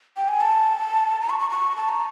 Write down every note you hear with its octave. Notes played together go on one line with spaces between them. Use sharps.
G5
G#5
A5
A#5
C#6
C#6
C#6
A5
A#5